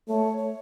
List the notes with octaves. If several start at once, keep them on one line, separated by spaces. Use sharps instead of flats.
A3 C#5
C#5